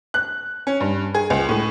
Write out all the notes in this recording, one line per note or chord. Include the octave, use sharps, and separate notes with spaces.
F#6
C#4
G2
G#4
C#2
A2